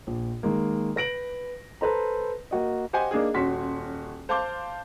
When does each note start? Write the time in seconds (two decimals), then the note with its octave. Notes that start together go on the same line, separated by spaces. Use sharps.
0.07 A#1
0.43 D#3 G#3 A#3
0.96 B4 A#6 D7 F#7
1.81 A4 B4 C5 A#5
2.51 A#3 F#4 D#5
2.93 G4 C5 D#5 F#5 G#5
3.11 A#3 D4 D#4 G#4
3.34 D#1 C#4 F#4 C6 B6
4.29 C5 F5 A5 C6 D6 G6